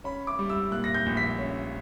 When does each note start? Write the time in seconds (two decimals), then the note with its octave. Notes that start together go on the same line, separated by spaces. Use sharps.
0.04 C#4 B5
0.27 D6
0.39 G3
0.49 E6
0.71 A#2 F#6
0.84 A#6
0.94 G6
1.06 A#1
1.17 B6
1.39 C#4